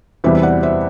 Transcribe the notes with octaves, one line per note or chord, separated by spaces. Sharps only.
E2 C3 E3 G3 C5 E5
E5
D5 F#5
C5 E5